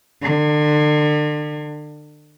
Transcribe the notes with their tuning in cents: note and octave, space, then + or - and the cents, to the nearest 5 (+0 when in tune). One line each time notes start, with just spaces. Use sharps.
D3 +35